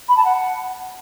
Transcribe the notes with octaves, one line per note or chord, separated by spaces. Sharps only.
B5
A5
F#5